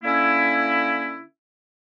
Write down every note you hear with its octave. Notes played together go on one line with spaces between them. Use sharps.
D3 A#3 C#4 E4